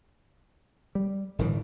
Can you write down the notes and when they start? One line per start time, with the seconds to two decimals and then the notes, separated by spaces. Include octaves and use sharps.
0.95 G3
1.39 G1 A2 D#3 E3